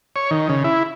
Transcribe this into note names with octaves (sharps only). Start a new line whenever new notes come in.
C#5
D#3
C#3
E4